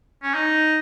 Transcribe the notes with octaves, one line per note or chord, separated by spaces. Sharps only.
C#4
D#4